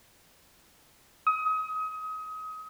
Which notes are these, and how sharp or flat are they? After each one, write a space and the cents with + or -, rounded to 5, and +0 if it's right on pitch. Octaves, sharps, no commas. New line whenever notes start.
D#6 +30